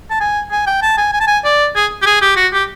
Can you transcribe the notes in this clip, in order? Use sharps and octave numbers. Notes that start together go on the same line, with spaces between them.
A5
G#5
G#5
G5
A5
G#5
G#5
A5
G#5
D5
G#4
G4
G#4
G4
F#4
G4